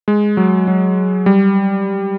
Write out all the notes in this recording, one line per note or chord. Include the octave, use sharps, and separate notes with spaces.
G#3
F#3
F#3
G3